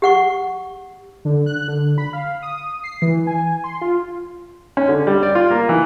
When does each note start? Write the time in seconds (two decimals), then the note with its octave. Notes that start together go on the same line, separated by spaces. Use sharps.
0.02 G4 F#5 C#6
1.25 D3
1.46 F#6
1.68 D3
1.98 B5
2.13 F5
2.42 D#6
2.84 C7
3.02 E3
3.27 G#5
3.64 C6
3.81 F4
4.77 C#4
4.88 D3
5.07 G3
5.23 D5
5.35 F4
5.51 A#3
5.69 E3